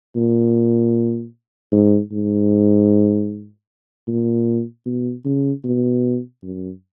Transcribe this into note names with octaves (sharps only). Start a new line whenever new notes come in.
A#2
G#2
G#2
A#2
B2
C#3
B2
F#2